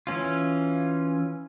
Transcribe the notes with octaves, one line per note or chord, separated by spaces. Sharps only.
E3 C#4 F4